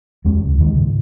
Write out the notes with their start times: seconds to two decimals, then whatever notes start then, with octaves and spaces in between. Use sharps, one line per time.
0.25 E2 G#3 C#4
0.44 C#2
0.58 D#2 D#3 G#3
0.74 G#2 C#3